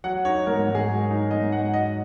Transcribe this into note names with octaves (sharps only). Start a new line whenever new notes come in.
F#3 F#5
D#4 C#5
G#2 A#4
G#2
G#4
F#3
D#4
G#2 D#5
G#2 F#5
F#3 D#5